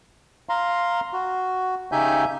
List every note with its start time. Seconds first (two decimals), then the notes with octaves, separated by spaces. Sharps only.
0.49 F5 A#5 C6
1.13 F#4
1.92 C#3 D#4 G4 E5 G#5 G6